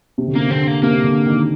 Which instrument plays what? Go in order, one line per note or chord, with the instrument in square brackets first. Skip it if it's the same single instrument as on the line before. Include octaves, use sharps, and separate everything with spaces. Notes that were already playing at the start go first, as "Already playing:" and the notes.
[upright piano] C3
D3
[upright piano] C3 [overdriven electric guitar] A#3
[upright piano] D3 [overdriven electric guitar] C4
[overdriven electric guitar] A#3
[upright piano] C3 [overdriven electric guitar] A#3
[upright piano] D3
D#3